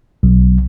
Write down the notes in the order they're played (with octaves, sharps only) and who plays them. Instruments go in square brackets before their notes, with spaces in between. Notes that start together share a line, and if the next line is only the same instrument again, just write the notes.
[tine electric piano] B1